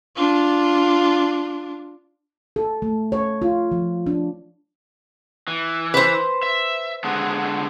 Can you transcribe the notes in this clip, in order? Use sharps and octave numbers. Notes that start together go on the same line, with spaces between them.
D4 F4
A4
A3
C#5
F4
F3
D4
E3
B4 C5
E5
D3 G#3 B3